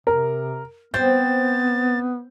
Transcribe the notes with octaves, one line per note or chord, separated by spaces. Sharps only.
C3 A#4
B3 C4 G6 A6